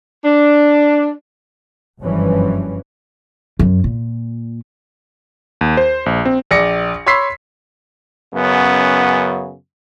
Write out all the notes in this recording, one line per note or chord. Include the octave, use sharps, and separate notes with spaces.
D4
F#1 G2 E3 F3 G3 C#4
F#2
A#2
D#2
C5
A#1
C4
A#1 D5 A#6 C#7
C#5 B5 C6 E6 B6 C7
F#2 C#3 B3